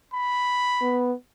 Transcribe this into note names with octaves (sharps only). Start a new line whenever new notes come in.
B5
B3